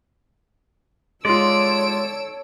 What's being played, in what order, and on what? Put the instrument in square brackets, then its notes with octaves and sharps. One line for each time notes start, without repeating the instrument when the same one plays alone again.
[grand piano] G#3 F4 [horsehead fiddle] A4 C#5 [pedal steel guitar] D5 [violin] E6 D7